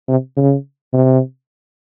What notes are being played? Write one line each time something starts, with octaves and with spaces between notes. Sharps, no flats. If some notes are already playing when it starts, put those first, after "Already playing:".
C3
C#3
C3